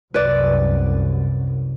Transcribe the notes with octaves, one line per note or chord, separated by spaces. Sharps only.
C2 F#2 B4 D5